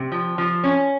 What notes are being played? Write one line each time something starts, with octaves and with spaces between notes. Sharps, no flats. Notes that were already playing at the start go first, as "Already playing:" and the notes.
Already playing: C3
F3
F3
C#4